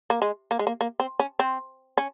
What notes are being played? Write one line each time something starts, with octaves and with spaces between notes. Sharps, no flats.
A#3
G#3
A#3
G#3
A#3
A#3
C4
C#4
C4
C#4